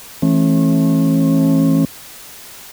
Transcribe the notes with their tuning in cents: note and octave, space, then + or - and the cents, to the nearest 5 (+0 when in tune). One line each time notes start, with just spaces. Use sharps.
E3 +0 A3 -15 C#4 -40